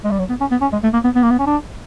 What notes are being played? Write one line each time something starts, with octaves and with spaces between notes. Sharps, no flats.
G#3
G3
F#3
B3
C#4
B3
C#4
G#3
A3
A#3
B3
B3
A#3
B3
C#4
D4